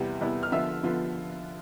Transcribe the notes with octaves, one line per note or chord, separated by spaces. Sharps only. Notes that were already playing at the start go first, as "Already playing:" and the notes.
Already playing: E2 C3 G3 B3 E4
E2 C3 G3 B3 E4
F6
D3 F3 B3 F4 E5 E6
D3 F3 B3 F4